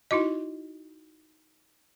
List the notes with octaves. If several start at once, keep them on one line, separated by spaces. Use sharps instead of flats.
D#4 E4 F#4 D#5